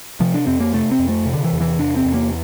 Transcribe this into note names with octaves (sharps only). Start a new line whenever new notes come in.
C3 F3
D4
F2 C4
A#3
C3 A3
C4
F2
A3
C3
D3
E3
E2
E3
C3 D4
C4
E2
A#3